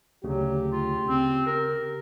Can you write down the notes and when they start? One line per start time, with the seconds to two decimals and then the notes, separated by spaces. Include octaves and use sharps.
0.24 D2 C#3 F#3 G4
0.72 F4
1.07 C#3 C4
1.46 A#4